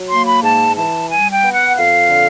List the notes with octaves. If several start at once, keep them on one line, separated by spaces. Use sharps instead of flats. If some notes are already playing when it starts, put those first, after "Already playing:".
Already playing: F#3
A#3 C6
B5
G#2 A5
E3 A5
G3 G#5
G5
B3
F#5
F2 F5
D3